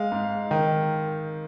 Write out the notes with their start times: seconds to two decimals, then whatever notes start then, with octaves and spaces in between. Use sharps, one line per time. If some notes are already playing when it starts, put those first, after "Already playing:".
Already playing: G#3 F5
0.12 G#2
0.51 D#3